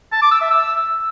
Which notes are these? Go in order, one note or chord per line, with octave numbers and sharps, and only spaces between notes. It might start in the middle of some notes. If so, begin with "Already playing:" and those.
A5
D6
E6
E5
E6